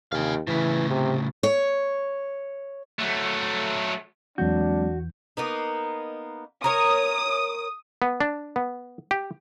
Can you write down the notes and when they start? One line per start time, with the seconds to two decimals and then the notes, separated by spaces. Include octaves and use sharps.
0.12 D#2 F5 G#5
0.47 A2 C#3 E3
0.90 C3
1.43 C#5
2.99 F#3 A3
4.38 E2 E3 F#3 G#3 C4 D4 F#4 G6
5.37 A#3 B3 D#4
6.64 A#4 C#5 D#6
8.02 B3
8.20 D4
8.56 B3
9.11 G4